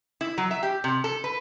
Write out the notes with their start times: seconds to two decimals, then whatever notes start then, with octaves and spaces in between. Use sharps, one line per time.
0.21 E4
0.38 F#3
0.51 E5
0.63 G4
0.84 C3
1.04 A4
1.24 B4